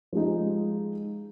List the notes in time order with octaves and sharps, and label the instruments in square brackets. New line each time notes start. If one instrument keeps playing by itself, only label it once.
[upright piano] F3 G#3 D#4